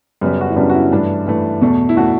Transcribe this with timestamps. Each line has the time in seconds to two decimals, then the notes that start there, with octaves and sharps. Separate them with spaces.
0.21 F#2 C#3 G3 B3
0.41 F#4
0.49 E4
0.56 F#2 C#3 G3 B3 D4
0.70 F#4
0.74 E4
0.92 G2 E3 A3 D4
1.26 G2 E3 A3
1.61 E2 B2 A3
1.89 E4
1.97 B2 A3 F#4